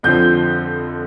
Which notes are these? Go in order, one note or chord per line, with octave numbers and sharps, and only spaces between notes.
F2 D3 F3 C4 G6